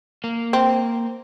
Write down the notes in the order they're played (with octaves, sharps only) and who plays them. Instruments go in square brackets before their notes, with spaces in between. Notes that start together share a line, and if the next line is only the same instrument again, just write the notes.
[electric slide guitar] A#3
[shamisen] C4